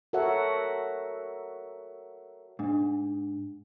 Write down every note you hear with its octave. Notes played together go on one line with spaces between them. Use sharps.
F#4 A4 A#4 C#5 E5 F#5
G#2 D4